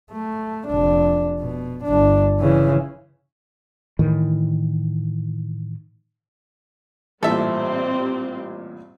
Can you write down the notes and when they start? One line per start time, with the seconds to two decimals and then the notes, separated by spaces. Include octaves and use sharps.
0.11 A3
0.67 F1 D4
1.40 B2
1.84 G1 D4
2.40 C#3 E3
3.99 A2 D#3 E3
7.23 A1 G2 A#2 G3 C4 A4 E5